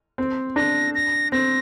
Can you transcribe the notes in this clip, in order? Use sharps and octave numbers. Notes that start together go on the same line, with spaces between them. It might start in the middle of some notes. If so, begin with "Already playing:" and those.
C4
D4 A#6
A#6
C4 A#6